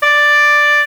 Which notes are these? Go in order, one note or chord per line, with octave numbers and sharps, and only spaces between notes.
D5